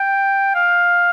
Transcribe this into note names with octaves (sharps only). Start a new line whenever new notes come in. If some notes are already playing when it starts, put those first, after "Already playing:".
Already playing: G5
F5